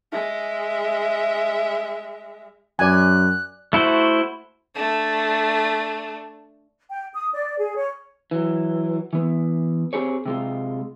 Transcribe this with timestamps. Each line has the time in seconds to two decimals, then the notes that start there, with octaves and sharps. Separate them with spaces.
0.12 G#3 E5
2.79 F#2 D5 G#5 F#6
3.73 A3 E4 F#4 C5
4.75 A3 D4
6.90 G5
7.15 D#6
7.33 D5
7.59 G#4
7.76 C#5
8.31 E3 F#3
9.13 E3 B3
9.93 C4 G4 G#4 C#5
10.26 C3 G#3 F4